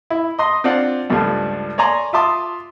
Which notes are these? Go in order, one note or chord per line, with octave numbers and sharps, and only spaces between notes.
E4
D#5 C6
C4 D4 F4 D5 F#5
C#2 G2 F3 G3 A3
C#5 D5 G#5 A#5 C6
F4 E5 A5 C6 D6 D#6